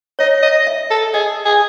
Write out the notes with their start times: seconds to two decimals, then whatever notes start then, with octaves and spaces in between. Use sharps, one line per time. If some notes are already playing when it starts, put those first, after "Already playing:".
0.19 C#5 D#5
0.42 D#5
0.67 E5
0.90 A4
1.14 G#4 D#5
1.45 G#4